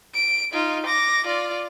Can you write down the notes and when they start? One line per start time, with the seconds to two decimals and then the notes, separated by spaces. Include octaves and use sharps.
0.14 D7
0.52 D#4 F4
0.86 D6 A#6
1.26 F4 D5